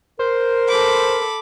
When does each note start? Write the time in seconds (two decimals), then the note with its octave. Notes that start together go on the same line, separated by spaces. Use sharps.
0.19 A#4 C5
0.68 A4 B5 D6